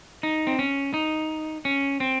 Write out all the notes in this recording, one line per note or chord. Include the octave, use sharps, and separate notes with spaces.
D#4
C4
C#4
D#4
C#4
C4